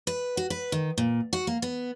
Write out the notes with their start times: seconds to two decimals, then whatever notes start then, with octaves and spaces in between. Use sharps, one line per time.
0.07 B4
0.37 F#4
0.50 B4
0.72 D#3
0.98 A#2
1.33 F#4
1.47 A#3
1.62 B3